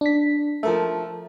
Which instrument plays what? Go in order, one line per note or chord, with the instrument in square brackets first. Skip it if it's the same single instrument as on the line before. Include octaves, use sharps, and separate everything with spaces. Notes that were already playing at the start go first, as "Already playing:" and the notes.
[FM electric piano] D4 B6
[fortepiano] F3 A3 [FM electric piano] A#4 E5